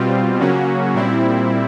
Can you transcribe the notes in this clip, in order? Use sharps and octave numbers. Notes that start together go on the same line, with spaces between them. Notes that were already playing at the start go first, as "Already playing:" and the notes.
Already playing: B2 G3 C4 F4
C#3 F#3 A#3 C#4 F#4
A#2 G3 C4 E4